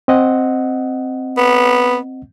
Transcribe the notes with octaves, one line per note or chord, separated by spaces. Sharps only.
C4 D#5 F#5
B3